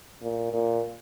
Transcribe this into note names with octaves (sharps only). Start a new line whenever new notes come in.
A#2
A#2